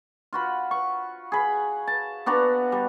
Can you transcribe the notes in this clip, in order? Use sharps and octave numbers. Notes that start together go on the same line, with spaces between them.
F4 F#4 B5
C#6
G#4 B5
A5
B3 D4 F#4 A#5
G3